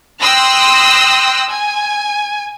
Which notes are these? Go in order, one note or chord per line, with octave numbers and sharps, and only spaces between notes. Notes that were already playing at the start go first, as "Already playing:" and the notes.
G5 C6 D#6 E6 F#6 A#6
G#5